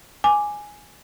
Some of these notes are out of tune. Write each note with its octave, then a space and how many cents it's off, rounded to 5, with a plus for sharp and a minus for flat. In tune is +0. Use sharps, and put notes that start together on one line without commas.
G#5 +0 D6 +0